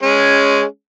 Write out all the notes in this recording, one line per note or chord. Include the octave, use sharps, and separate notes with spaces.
G#3 C#4